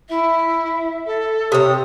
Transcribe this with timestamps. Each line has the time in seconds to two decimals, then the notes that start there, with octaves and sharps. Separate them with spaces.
0.09 E4 E5
1.06 A4
1.52 C3 C#5 D#6